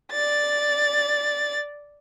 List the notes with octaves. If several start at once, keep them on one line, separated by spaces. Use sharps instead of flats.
D5 A6